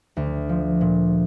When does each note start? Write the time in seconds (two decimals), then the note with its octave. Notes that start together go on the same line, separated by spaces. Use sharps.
0.17 D2
0.49 F3
0.81 A#2